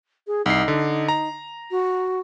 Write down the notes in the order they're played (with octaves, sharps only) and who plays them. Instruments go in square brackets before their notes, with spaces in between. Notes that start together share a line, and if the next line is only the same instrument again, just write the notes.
[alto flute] G#4
[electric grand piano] C2 C7 [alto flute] D#4
[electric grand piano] D3
A#5
[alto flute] F#4